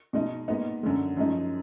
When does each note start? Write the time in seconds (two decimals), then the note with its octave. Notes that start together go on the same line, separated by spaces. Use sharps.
0.13 B2 G#3 D#4
0.48 A#2 G#3 B3 D#4
0.83 F#2 D3 G#3
1.17 F#2 F3 G#3 D#4